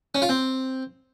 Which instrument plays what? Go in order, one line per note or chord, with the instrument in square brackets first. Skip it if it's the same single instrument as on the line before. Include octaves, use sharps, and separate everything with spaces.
[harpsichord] C#4
F4
C4